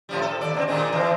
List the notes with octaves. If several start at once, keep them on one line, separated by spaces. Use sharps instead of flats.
A2 F3 G3
A4
D#2 D5
B2 A#3 C4
A#2 D#3 G#3
E3 C4